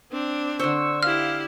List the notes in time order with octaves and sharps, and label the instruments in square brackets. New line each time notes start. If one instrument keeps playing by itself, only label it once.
[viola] C4 D4
[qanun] D3 C5 [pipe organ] C#6 E6
[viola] E4 G4 [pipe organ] F5 [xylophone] F6